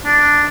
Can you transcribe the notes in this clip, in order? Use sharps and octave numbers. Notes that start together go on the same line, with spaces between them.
D4